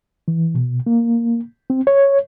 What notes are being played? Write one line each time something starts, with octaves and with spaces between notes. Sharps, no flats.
E3
B2
A#3
C4
C#5